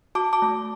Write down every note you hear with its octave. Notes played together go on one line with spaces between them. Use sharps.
F#4 A5 D6
A5 D6
A3